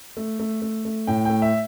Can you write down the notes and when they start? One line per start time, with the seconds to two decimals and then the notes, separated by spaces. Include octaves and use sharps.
0.17 A3
0.40 A3
0.62 A3
0.85 A3
1.07 A2 G5
1.25 A3 G5
1.42 E5